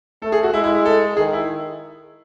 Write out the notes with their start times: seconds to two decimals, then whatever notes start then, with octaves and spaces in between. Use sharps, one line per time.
0.22 A3 A4
0.32 G#4
0.43 F#4
0.53 G#3 E4
0.64 E4
0.75 E4
0.85 A4
1.17 D#3 G#4
1.33 E4